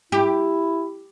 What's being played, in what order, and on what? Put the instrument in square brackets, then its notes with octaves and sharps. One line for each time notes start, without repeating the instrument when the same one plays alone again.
[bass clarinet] E4 [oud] G4